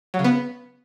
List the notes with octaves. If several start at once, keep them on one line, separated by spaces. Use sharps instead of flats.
F#3
C#3
B3